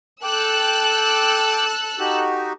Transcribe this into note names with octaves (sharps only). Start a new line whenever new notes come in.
A4 G5 D6 E6 F#6
D#4 F#4 G4